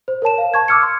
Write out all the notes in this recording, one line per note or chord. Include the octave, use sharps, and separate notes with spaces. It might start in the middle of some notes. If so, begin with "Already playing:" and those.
C5
A#4 C#5 A5 E7
F5
A5 C#6 G#6
D6 E6 F6 G#6 C#7
C6